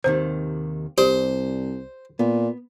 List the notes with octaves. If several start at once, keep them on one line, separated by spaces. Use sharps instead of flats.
D#2 C3 D#3 C5
C2 G4 C5 D5
A#2 B3